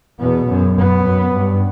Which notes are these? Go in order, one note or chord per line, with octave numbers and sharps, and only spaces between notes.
E2 B2 B3
F#2
F#2 B3
F#2
G2